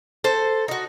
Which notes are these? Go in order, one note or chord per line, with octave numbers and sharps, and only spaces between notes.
A4 C5
D#4 F#4